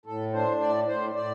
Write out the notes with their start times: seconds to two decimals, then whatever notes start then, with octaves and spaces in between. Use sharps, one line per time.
0.06 A2 A4
0.33 D4 C5
0.60 A2 D5
0.87 A2 C5
1.15 A2 D5